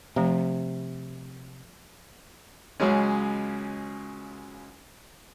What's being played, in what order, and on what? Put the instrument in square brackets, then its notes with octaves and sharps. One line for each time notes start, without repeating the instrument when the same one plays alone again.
[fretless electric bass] C3 [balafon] F3 A3 A#5
[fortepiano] C#2 C#3 F#3 G#3 C#4